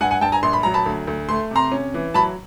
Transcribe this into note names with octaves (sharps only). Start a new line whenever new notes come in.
G2 F#5 G#5
F#5 G#5
G2 G5 A5
G#5 A#5
A#1 C6
B5
F#3 A#5
A5 B5
D2
D2
A3 C6
C3 A#5 C6
C#4
E3
F#3 A5 B5